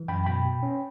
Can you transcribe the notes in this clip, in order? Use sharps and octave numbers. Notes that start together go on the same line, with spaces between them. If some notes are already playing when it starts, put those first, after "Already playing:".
Already playing: E3
F#2 G5 B5
B2 G5 B5
B2
C#4